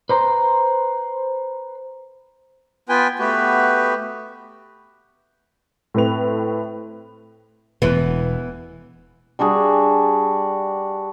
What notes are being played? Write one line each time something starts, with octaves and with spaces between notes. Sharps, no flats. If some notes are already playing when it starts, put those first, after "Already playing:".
B4 C5 A#5 C6
B3 F4 B4 G5 G#5
A3 B3 F#4 G4 B4
A2 C4 B4 F7
E1 B2 E3 B3
G3 D4 F#4 G#4